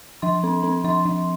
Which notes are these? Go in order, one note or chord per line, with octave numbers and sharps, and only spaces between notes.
F3 C6
C4
C4
F3 C6
F3